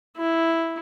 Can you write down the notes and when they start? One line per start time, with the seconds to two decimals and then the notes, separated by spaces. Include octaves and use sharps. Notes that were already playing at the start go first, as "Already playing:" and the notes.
0.17 E4